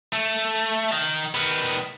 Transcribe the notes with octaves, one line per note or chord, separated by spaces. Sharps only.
A3
D#3
D#3 B3